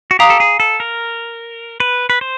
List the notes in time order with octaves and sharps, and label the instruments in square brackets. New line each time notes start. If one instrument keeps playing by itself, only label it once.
[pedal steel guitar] F#4
[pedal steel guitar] G4 [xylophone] F5 A#5 D#6
[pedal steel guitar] A4
G#4
A4
A#4
B4
B4
C5